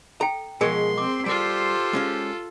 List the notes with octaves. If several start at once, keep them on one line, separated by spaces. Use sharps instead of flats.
A4 G5 A#5
B2 F3 G#3 G#4 A#4 C#5 G#5 C6
C4 D6
G3 F4 G4 A4 C5
G#3 C#4 F5